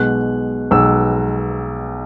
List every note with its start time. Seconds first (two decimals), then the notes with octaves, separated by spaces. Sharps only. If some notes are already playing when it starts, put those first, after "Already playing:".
Already playing: B1 B2 G#3 F#6
0.71 B1 B2 G#3 E6